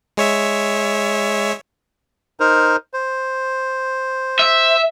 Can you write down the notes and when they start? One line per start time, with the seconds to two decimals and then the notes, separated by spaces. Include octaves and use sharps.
0.17 G#3 C#5 E5
2.40 D#4 A#4 C5
2.94 C5
4.39 E5